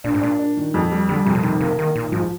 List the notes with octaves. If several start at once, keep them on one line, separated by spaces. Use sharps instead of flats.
A#2 D4
G#2
A#2 D4
D4
D#3
F2
G3
D3 G3
F2 C3
A#2
C3 D#3
C3 A#3
D#3 A#3
A#2 D#3
G#2 F3